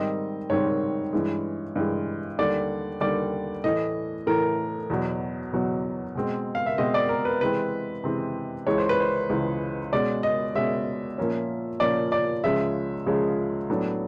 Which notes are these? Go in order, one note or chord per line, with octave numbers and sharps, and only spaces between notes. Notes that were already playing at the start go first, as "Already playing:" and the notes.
Already playing: G#2 D#3 G3 C4 D#5
G#2 D#3 G3 C4 C#5
G2 E3 G#3
G2 E3 G#3
D#2 D3 G3 D5
D#2 D3 G3 D5
A2 E3 A3 D#5
A2 E3 A3 A#4
E2 B2 F#3
E2 B2 F#3
B2 G#3 C4
F5
E5
B2 G#3 C4 D#5
D5
A#4
B4
C3 E3 G#3 C4 B4
C3 E3 G#3 C4
C#2 C#3 E3 G#3 C#5
C5
B4
C5
C#2 C#3 E3 G#3
B2 G#3 C#4 D5
D#5
B2 G#3 C#4 E5
A#2 F3 A#3 C#4
A#2 F3 A#3 C#4 D5
D5
C#2 C#3 F3 G#3 C#4 E5
C#2 C#3 F3 G#3 C#4
A2 F#3 B3 D4